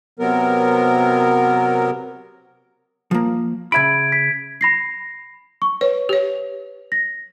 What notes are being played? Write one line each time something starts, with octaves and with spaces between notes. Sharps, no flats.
C3 F#3 B3 A#4
F3 A#3
C#3 E5 B5 G#6 D7
B6
B5 A#6 C7
C#6
B4 C#5
G4 C#5
A#6